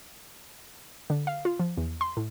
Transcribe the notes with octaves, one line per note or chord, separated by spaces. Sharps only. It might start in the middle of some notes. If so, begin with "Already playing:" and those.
D3
F5
F4
F3
E2
C6
A2